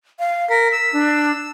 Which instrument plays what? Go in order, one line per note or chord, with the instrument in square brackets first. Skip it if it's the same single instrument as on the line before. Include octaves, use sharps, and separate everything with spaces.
[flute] F5
[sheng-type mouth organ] A#4 [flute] B6
[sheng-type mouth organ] E6
[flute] D4